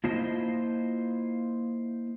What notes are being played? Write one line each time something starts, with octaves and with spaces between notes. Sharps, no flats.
A#3 E4 F4 C5 D#5 A5